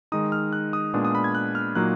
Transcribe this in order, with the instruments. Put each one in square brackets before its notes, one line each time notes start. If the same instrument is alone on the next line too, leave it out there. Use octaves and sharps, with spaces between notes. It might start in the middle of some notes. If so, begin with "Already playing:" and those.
[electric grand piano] D#3 G#3 D#4 D#6
F6
F#6
D#6
A#2 G#3 B3 D4 D#6
D#6
B5
G#6
F#6
F6
A#2 F#3 A#3 D#4 F#6